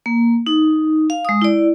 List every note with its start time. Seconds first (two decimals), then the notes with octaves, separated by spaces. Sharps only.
0.06 A#3
0.47 D#4
1.10 F5
1.25 G#3 D#6
1.42 E4 D5